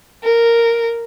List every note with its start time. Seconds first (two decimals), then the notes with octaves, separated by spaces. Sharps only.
0.23 A#4